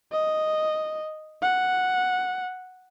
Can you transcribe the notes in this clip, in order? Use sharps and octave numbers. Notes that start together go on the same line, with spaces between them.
D#5
F#5